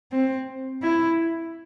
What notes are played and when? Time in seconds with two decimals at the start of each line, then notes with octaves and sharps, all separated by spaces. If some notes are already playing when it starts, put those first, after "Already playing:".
0.12 C4
0.83 E4